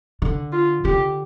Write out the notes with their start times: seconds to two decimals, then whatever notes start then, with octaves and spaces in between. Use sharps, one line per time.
0.22 D3
0.52 F4
0.84 D3 G4